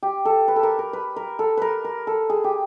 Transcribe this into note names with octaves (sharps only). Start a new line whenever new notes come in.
G4
A4
B4
A4
A#4
A#4
B4
A#4
A4
A#4 B4
A#4
A4
G#4
G4